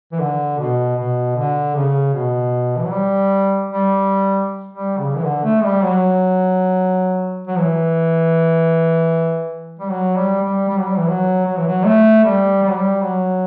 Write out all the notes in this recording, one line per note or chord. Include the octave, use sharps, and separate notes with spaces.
E3
D3
B2
B2
D3
C#3
B2
E3
F#3
G3
G3
G3
C#3
E3
D3
A3
G3
F#3
F#3
E3
G3
F#3
G3
G3
G3
F#3
G3
E3
F#3
F#3
E3
F#3
A3
G3
G3
F#3
G3
F#3